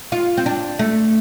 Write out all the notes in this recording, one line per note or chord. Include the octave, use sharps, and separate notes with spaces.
F4
C4
D4
A3